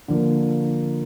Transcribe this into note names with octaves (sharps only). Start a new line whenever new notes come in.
D3 F3 A#3